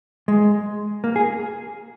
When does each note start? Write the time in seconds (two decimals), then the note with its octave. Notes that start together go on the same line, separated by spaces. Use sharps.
0.28 G#3
1.04 A#3
1.16 G#4